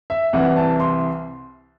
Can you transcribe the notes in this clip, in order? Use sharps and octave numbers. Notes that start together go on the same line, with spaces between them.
E5
C2 C3 E3 F#5
A5
C6